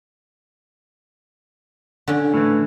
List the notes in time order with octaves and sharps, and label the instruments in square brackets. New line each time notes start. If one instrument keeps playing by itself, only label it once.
[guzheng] D3 C#4
[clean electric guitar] A2 E3